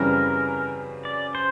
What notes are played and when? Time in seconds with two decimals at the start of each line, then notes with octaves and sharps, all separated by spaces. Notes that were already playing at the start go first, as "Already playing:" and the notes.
Already playing: F#2 C#3 E3 G3 C4 A#4
1.05 D5
1.35 C5